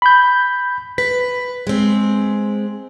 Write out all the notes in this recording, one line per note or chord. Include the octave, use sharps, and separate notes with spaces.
B5 G6
B4 B6
G#3 C4